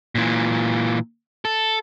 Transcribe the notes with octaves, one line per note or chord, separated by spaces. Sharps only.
A#2 E3
A4